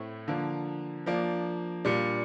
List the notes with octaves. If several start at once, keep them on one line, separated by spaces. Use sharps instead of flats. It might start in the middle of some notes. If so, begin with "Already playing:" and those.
Already playing: A2 A3 C4 E4
D3 F3 A#3
F3 A#3 D4
A#2 G3 D4